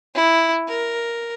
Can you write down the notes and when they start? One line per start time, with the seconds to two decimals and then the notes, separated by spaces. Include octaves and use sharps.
0.15 E4
0.68 A#4